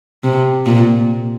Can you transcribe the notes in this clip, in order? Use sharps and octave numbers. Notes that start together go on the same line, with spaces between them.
C3
A#2